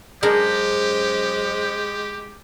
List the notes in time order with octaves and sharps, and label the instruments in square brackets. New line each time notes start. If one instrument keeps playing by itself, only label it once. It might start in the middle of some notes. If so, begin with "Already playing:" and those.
[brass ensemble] F#2 C#4 C5 [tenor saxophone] G#3 [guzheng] D4 G#4 A#4 [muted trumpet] G4